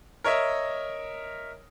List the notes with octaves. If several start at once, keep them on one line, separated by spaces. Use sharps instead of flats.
A#4 C#5 D#5 E5